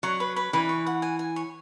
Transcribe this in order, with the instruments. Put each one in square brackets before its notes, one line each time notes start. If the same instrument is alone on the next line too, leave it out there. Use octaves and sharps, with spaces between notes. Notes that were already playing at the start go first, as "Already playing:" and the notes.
[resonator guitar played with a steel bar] F#3 [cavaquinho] C#6
[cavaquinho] B4
B4
[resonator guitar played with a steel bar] E3 [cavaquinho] B4
[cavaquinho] C#6
F#5
G#5
G#5
C#5